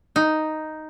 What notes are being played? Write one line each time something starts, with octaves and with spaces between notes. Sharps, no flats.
D#4